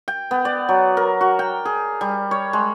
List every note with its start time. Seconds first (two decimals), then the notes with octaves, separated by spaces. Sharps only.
0.08 G5
0.31 B3
0.45 D5
0.69 F#3
0.97 A#4
1.21 F#4
1.39 G5
1.65 G#4
2.01 G3
2.31 C#5
2.53 G#3